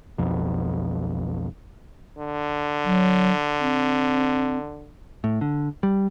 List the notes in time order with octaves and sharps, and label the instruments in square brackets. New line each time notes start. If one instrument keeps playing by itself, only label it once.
[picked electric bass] B1 F2
[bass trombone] D3
[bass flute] F#3
C4
[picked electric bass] A2
D3
G3